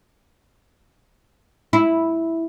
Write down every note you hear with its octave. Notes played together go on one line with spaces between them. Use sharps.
E4